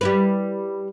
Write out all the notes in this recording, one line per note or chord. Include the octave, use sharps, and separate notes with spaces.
G3 E4 B4